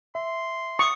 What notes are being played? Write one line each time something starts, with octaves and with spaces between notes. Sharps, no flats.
E5 C6
C#6 D#6